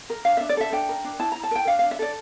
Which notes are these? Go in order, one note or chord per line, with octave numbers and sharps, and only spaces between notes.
A#4
D4 F5
D4 E5
D5
A4 E5
D4 G5
A#4
D4
E4 A5
E4 A#5
A5
A#4 G5
D4 F5
D4 F5
E5
A4 D5